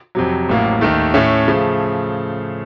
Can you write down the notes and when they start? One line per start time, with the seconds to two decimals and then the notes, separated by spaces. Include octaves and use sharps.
0.15 F2 C3 F#3
0.49 A1 A2 F#3 A#3
0.81 D#2 D#3 A3
1.14 A2 A3 C#4
1.48 C#3 F3 A3